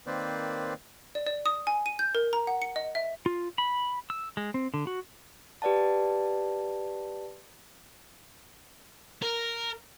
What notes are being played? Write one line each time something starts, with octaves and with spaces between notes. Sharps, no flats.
D#3 A#3 C4 B4 C5 D5
D5
D5
D#6
G#5
D#7
G6
A#4
A#5
F#5
C#7
D#5
E5
F4
B5
E6
G#3
C4
D3
F#4
G4 B4 D5 F#5 A5
A#4